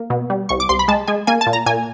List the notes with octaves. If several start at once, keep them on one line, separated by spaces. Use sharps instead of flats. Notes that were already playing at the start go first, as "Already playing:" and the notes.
Already playing: A#3
B2
G3
C2 C#6
D6
C2 C6
B5
G#3 A5
G#3 G#5
A#3 G#5
A5
A#2
A#5
A#2 G#5